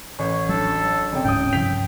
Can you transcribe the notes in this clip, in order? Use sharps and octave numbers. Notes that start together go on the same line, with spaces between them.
A1 C#5
F#3 D4 A4
F#1 C3 G5
D1 G1 G#2 C#3 G5 D#6
G2 C3 F3 G6 B6 F7